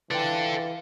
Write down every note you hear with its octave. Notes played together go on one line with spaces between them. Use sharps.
E3 F4 A4 B4 D5 G5